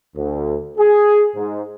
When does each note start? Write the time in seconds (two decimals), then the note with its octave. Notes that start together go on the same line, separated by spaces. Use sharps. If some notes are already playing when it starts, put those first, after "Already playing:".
0.16 D2
0.78 G#4
1.35 G#2